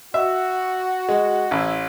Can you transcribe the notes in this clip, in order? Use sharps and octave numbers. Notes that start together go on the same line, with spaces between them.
F#4 E5
G#3
A1 E4